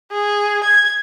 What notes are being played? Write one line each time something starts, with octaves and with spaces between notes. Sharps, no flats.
G#4
G#6